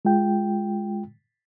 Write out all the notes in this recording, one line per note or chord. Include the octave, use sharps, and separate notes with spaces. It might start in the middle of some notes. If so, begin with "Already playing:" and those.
G#3 F4 G5